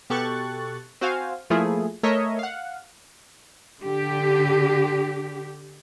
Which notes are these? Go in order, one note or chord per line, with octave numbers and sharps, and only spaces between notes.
B2 G4 A4 C#6 F#6 A6
C4 F#4 C5 F5 G#5
F3 A3 A#3 E4 F4 G#4
A3 A#4 C#5 D#5 E5
F5 F#5
D3 G4